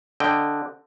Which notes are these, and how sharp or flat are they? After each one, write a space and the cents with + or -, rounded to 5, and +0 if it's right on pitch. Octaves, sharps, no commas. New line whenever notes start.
D3 +0 D#5 +0 G5 +0